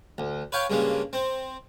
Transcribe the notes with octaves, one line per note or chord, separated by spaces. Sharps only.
D2
B4 C#5 F5 G5
G2 C#3 G#3 A#3
C4